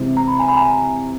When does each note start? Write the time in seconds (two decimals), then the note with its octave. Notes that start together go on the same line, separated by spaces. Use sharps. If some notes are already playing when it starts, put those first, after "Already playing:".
Already playing: C3 E3 G#3 C4
0.17 A#5
0.28 B5
0.39 G#5 A#5
0.48 B5
0.56 G#5 A#5